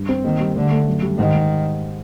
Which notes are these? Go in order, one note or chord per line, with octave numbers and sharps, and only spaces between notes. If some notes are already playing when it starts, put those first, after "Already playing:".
Already playing: G2
C4
D#3 A#3
G3
D3 A3
A3
F#2
G3
G#2 D#3
G#2